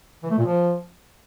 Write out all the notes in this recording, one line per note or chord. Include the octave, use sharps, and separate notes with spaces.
E3
A3
A#2
F3